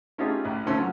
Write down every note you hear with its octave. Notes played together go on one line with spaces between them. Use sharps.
A3 C#4 D#4 F4 G4 G#4
A1
D2 F3 A3 C#4 C6
F#3